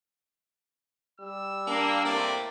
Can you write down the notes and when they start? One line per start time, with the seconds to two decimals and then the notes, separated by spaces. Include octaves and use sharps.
1.20 G3 E6
1.67 A#3 D4
2.05 A2 C3 A#3 D5